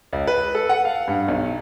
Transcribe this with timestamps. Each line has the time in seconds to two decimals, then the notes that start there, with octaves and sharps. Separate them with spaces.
0.13 C#2
0.27 B4
0.55 A4
0.69 F#5
0.85 F5
1.08 G2
1.28 B1